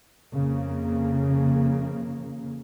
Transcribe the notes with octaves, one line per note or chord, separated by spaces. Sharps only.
F2 C#3 A#3